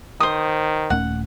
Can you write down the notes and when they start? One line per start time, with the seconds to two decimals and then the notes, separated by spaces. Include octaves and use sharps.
0.20 D#3 C5 D#6
0.90 D#1 A3 C#4 F#5